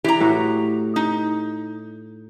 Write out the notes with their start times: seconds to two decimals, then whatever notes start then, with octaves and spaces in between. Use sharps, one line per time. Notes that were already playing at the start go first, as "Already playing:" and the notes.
0.04 E3 G4 A#5
0.21 A2 F#4
0.96 D#4